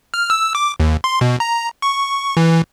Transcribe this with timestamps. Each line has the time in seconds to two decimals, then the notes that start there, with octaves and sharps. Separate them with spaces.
0.14 F6
0.30 E6
0.55 D6
0.80 D#2
1.04 C6
1.21 B2
1.40 A#5
1.82 C#6
2.37 E3